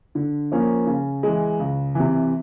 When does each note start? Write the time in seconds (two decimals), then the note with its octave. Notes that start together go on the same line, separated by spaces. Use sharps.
0.15 D3
0.52 F3 A#3 C#4
0.87 C#3
1.23 E3 G#3
1.59 C#2
1.95 C3 E3